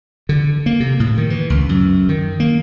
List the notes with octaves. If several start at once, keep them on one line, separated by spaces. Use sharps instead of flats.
D3
A#3
C3
A2
D#3
E3
C#2
F#2
D#3
A#3